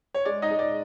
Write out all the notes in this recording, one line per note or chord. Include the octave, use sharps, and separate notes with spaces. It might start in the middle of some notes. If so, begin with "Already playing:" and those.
C#5
G#3 D5
D#4 D#5
G#3
D5